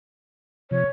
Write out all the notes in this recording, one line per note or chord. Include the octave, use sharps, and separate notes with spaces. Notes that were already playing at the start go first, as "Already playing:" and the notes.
C3 F3 C#5